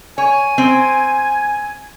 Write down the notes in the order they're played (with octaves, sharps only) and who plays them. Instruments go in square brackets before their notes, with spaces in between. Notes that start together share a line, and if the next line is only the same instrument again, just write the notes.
[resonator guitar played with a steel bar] C#5 [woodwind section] G#5
[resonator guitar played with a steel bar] C4